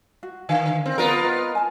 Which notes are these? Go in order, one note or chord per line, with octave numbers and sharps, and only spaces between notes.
F#4
D3 F5 G#5
C4 A#4
B3 F4 A#4 D5
B4 D#5
G#5 A5